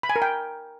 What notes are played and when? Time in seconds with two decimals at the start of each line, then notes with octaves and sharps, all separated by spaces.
0.03 B5
0.09 G#5
0.16 A#4
0.22 G5